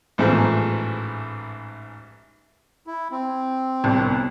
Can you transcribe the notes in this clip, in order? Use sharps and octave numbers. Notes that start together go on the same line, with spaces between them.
A1 G#2 E3 F3 A3
E4
C4
G1 C2